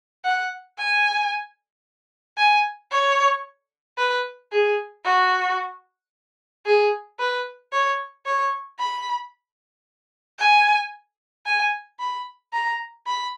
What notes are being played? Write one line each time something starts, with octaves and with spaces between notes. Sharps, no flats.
F#5
G#5
G#5
C#5
B4
G#4
F#4
G#4
B4
C#5
C#5
B5
G#5
G#5
B5
A#5
B5